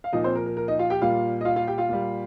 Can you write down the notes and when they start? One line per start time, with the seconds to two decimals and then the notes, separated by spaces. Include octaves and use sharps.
0.04 F5
0.13 A#2 F3 D#4 D#5
0.24 C4 C5
0.35 A#4
0.46 A#4
0.57 A#4
0.68 D#4 D#5
0.79 F4 F5
0.90 G4 G5
1.01 A#2 G3 F4 F5
1.41 D#5
1.45 F4 F5
1.56 F4 F5
1.67 G4 G5
1.78 F4 F5
1.89 A#2 G3